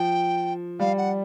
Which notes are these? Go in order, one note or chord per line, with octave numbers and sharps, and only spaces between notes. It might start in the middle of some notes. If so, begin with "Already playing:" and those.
Already playing: F3 G5
G3 F5
F#5